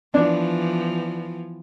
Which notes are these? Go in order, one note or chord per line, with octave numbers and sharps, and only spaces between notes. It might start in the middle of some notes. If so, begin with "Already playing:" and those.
E3 F3 B3 D4